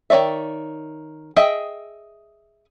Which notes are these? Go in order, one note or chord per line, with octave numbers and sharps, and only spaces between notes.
D#3 C#4 C#5 D5 E5
G#4 D#5 E5 G5